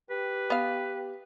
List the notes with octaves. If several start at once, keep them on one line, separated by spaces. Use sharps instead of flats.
G4 B4
B3 F5